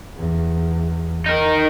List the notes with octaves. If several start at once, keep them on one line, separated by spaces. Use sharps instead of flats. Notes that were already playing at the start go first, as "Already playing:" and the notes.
E2
D#4 A#4